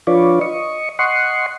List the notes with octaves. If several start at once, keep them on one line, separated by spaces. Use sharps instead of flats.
F3 D4 F4 B4 C#5 D5
D#5 C#6
D#5 F#5 C6 C#6